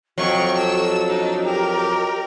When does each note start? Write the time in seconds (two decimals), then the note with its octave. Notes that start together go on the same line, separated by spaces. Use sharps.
0.18 F2 F#3 F#4 G5 C#6
0.58 A4 E6
1.06 D4 D#4
1.46 G4 A#4